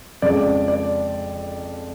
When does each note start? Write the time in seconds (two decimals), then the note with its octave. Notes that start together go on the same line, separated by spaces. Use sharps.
0.22 F2 C#3 F3 G#3 D5
0.68 D5